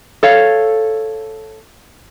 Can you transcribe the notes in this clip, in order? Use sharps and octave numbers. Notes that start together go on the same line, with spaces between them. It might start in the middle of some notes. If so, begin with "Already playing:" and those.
A4 C#5 F5